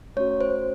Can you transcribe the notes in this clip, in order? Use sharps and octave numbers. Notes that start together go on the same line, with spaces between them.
A3 C#4 F#4 C#5
C5